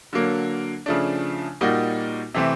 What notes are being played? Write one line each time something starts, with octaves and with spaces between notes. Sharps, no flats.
D3 F#3 A#3
C#3 F3 A3 D4
A#2 G3 A#3 D#4 F#4
C3 E3 A3 C4